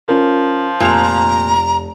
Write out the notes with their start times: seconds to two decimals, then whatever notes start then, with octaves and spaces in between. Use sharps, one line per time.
0.08 F3 C#4 F4 A#4
0.80 F1 A#2 A#5 F7